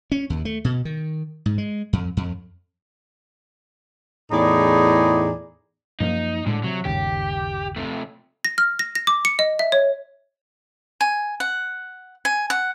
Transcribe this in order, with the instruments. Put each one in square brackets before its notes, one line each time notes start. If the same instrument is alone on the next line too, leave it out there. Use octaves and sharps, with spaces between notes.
[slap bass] C#4
D#2
A3
B2
D#3
G#2
G#3
F2
F2
[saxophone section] E2 A2 D#4 G#4 D5
[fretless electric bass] F#2 F3 A#3 [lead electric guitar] D#4
[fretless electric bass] A2 G#3 [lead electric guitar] D3
[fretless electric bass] C3 [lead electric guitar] F#3
[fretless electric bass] G1 D#2 C#3 [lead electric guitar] G4
[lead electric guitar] C3 A3
[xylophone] A#6
F6
A#6
A#6
D6
C#7
D#5
E5
C#5
[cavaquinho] G#5
F#5
G#5
F#5